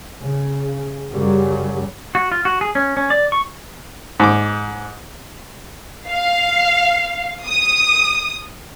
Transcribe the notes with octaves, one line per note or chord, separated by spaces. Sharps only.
C#3
F#2 C#3 F#3 G3
F#4
F4
F#4
G#4
C#4
C#4
D5
C#6
G#2 D6
F5
D#6